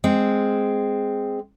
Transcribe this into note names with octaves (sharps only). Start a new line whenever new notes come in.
G#3 C4